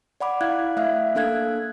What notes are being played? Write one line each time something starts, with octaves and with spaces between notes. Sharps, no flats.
D5 F#5 B5 D6
E4 F5 F#6 G#6
A3 E5 F5 F#6
A#3 D4 A4 F5 F#6 G#6